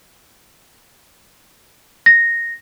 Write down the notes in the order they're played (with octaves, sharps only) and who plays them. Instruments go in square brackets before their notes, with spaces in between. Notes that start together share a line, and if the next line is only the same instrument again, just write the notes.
[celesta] A#6